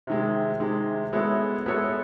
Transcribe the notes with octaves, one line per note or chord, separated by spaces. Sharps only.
C3 D#3 G#3
C3 D#3 G#3
G#3 B3 E4 A4 C#5
G#3 B3 E4 A4 C#5